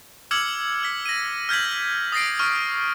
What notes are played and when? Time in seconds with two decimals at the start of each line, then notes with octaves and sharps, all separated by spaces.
0.31 D6 E6 F6 G#6 C#7 F#7
0.83 F6 B6
1.06 A#6 D#7
1.49 F6 G6 G#6 B6 F#7
2.12 D#6 A6 A#6 C7 D7
2.39 C#6 F6